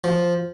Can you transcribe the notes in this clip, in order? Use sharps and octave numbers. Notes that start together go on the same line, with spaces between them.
F3